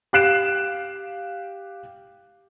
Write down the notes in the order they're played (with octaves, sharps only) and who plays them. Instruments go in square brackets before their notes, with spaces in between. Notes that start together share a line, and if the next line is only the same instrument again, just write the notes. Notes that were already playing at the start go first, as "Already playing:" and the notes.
[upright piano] G4 F5 F#6 C7 D7 E7